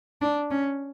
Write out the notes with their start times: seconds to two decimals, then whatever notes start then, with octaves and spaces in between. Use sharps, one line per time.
0.21 D4
0.50 C#4